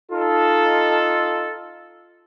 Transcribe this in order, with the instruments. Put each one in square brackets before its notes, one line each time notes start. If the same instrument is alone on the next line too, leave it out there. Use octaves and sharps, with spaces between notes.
[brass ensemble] D#4 F4 A4